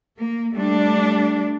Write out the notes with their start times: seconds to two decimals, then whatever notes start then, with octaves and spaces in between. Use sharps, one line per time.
0.20 A#3
0.54 G3 A3 D4